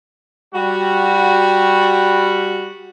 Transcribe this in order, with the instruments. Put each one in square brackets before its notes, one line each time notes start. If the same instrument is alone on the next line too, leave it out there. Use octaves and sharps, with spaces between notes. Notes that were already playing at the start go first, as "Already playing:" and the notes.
[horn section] G3 F#4